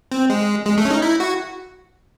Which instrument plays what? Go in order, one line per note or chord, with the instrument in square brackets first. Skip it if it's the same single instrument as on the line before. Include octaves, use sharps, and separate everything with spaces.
[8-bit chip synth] C4
G#3
G#3
A3
C#4
D#4
E4
F#4